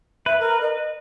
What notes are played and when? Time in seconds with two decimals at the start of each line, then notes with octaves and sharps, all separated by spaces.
0.26 B4 E5
0.39 A#4
0.61 D#5